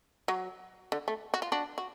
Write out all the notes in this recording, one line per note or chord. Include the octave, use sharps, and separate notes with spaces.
F#3
D3
A3
F#4
F4
D4 F#4
F#4